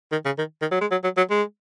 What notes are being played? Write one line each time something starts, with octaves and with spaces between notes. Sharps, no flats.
D#3
C#3
D#3
D#3
F#3
G#3
F#3
F#3
F#3
G#3